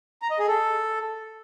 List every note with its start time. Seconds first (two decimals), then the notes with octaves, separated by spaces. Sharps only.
0.22 A#5
0.30 D#5
0.39 G#4
0.47 A4